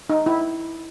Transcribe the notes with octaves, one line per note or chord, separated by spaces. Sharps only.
D#4
E4